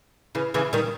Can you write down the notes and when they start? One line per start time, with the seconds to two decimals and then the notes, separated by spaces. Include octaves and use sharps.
0.35 C#3 E3
0.54 C#3 E3
0.73 D#3 G3